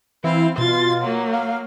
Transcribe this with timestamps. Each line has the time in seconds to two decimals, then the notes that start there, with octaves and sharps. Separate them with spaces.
0.24 E3 C4 E4 F5
0.58 B2 F4 C6 A6
1.01 F#3 A#3
1.33 F5